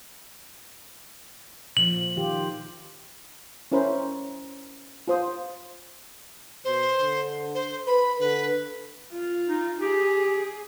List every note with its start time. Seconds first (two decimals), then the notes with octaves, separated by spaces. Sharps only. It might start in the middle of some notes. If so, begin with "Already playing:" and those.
1.77 A#2 F3 F#7
2.17 D#3 F4 G4
3.72 C#4 E4 A#4 C5 B5
5.08 F4 C5 D#6
6.65 B2 C5
7.00 D3
7.55 C5
7.87 B4 B5
8.20 D3 B4
9.12 F4
9.49 D#4
9.81 G4 G#4